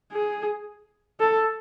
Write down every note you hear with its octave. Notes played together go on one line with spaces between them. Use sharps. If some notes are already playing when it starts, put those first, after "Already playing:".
G#4
A4